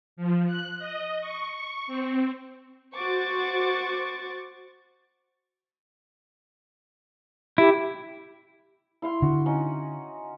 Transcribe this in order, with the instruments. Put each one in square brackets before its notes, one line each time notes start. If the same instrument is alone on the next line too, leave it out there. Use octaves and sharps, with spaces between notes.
[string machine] F3
F#6
D#5
C#6
C#6
C4
[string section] F#4 C5 C#6 D6 A6
[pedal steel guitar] E4 [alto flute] G4
[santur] E4 F5 C6
[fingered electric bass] D3 [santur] F#4
[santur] C#4 D#4 F#5